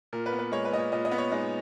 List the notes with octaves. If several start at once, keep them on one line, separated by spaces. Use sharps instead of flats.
A#2 A#4
B4
B3
B4
G#3 C#5
B4
A#2 D#5
C#5
A#2 D#5
D#5
B3
C#5
G#3 D#4